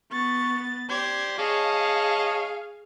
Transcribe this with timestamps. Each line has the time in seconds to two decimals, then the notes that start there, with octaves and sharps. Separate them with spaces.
0.12 B3 C#6 A6
0.90 G4 C5 D5 G#6
1.38 G#4 C#5 D#5 F5 A5